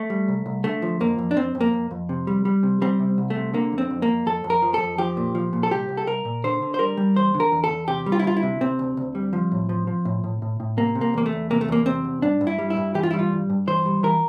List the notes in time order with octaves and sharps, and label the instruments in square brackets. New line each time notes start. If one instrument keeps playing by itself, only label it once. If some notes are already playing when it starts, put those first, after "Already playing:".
Already playing: [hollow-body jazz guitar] A3
G3
C2
C2
D3 A3
F3
F2 A#3
F2
D4
F2 C4
F2
A#3
F2
F2
C3
G3
G3
C3
G3 C4
C3
C2
A3
C3
D3 A#3
F2
C4
F2
A#3
F2
F2 A4
F2
A#4
F3
A4
F2
F3 G4
A#2
F3
A#2
A4
C2 G4
C2
A4
C2 A#4
A#2
D3 C5
D3
C5
G3 A#4
G3
E2 C5
D3
A#4
E2
A4
E2
C3 G4
G3
F4
E4
D2 F4
E4
C3
C3 C4
D2
D2
G3
F3
A2
F3
F3
A2
A2
A2
A2
C3 A#3
C3
A#3
E2 A#3
A3
E2
C3 A#3
A3
E2 A#3
C3 C4
E2
G2 D4
G2
E4
G3
E4
G2
E3 G4
F4
G3 E4
F4
G2
G2
E3 C5
G3
E3 A#4